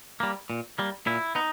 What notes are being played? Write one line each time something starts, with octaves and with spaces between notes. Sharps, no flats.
G3 A#3
A#2
G3 A#3
A#2 E4
B3 D#4